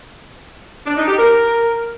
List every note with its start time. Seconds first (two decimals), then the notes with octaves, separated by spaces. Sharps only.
0.86 D4
0.97 D#4
1.08 G4
1.18 A#4